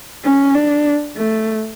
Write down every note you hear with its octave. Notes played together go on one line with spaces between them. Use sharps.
C#4
D4
A3